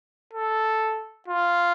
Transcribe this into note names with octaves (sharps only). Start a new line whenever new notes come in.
A4
F4